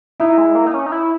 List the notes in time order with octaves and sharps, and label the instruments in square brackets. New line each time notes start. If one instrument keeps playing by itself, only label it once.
[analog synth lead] D#4 [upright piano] E4
[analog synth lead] G#3
A#3
D#4
C#4
D#4
E4